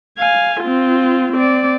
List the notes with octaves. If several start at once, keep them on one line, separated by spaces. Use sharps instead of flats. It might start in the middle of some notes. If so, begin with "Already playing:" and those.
F5 G#5
C4 F4
C4 D5